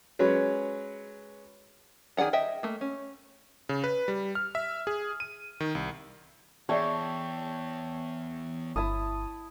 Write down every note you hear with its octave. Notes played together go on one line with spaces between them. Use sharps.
F#3 G#3 C#4 B4 C#5
D#3 G#4 D5 F#5 A#5
D#5 E5 G5
A3 A#3
C#4
C#3
B4
G3
F6
E5
G#4
D#7
D#3
C2
E2 G#4 C#5 D5 E5 G5 A5
G1 E4 A5 D#6